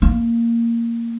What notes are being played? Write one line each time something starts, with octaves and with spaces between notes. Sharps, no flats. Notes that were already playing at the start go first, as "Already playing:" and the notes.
A#3